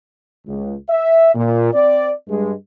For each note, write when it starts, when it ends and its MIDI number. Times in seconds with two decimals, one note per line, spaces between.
0.47 0.75 37
0.89 1.31 76
1.34 1.69 46
1.73 2.11 60
1.73 2.11 74
2.28 2.52 43
2.28 2.52 56